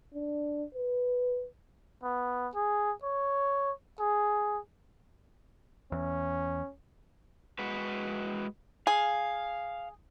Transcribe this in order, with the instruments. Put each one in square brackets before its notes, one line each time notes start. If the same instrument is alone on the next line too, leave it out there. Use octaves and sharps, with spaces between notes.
[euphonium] D4
B4
[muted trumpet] B3
G#4
C#5
G#4
[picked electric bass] E2 [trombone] C#4
[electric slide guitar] G#3 F#4 B4
[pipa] G#4 [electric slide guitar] F5